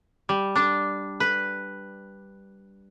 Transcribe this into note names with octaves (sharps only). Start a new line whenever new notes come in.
G3
D4
B4